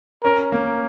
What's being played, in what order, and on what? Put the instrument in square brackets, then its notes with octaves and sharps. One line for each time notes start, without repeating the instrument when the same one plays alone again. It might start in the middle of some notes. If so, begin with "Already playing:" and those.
[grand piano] C#4 [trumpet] A#4
[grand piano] A#3